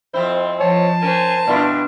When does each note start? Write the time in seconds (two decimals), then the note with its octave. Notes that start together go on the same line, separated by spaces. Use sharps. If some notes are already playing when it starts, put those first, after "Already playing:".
0.14 F2 C4 E4 C5
0.60 F3 C#5 A5
1.02 C#4 A#4 C5 G#5
1.47 B2 G3 D4 E4 F4